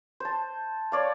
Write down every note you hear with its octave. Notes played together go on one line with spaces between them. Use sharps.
C5 A5
C#5 D5 F5